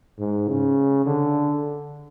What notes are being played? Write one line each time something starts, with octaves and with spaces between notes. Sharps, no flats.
G#2
C#3
D3